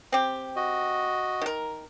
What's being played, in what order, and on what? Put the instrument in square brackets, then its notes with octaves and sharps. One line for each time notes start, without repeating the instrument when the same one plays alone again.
[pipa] C4 G4
[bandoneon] F#4 D#5
[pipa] D#3 A#4